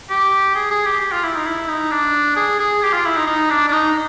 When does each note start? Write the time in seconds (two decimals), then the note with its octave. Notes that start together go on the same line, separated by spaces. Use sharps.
0.10 G4
0.55 G#4
0.71 G#4
0.85 G4
1.00 G4
1.12 F4
1.23 E4
1.35 D#4
1.46 E4
1.69 D#4
1.91 D4
2.36 G#4
2.59 G#4
2.82 G4
2.93 F4
3.05 E4
3.16 D#4
3.27 D#4
3.50 D4
3.68 D4
3.73 D#4